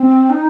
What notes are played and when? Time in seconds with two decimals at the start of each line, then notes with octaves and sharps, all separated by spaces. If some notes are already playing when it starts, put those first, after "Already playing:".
Already playing: C4
0.30 D#4